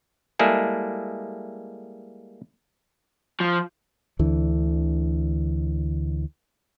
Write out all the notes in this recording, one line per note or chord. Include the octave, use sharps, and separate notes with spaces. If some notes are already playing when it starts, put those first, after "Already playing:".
G3 G#3 A#3 E4 G#4 A4
F3
D2 D3 E3